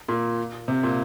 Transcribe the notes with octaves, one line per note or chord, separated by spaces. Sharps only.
A#2
C3
A#2